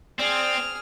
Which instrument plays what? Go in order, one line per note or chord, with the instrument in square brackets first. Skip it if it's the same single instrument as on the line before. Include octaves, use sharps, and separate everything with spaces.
[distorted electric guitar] C4 [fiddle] G#4 F6 [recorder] D5